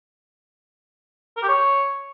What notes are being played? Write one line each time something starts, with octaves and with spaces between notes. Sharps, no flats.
A#4
G4
C#5